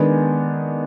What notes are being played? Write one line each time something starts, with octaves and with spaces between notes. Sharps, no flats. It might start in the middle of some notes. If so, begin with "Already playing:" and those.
Already playing: D#3 G#3 B3 D4 G#5